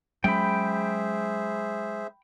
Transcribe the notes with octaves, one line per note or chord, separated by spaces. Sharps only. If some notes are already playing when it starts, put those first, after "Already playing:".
F#3 G#3 C#4 G#4 C5 E5 G5 B5